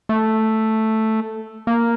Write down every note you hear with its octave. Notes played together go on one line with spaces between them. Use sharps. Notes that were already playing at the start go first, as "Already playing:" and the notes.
A3
A#3